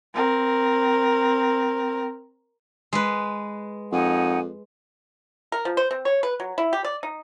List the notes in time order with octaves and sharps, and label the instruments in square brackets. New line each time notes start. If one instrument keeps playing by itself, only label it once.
[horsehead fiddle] C4 A#4
[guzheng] G#3 B4
[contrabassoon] F2 [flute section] D#4 F#5 G#5
[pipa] A#4
F3
C5
C4
C#5
B4
F#3
E4
G4
D5
D#4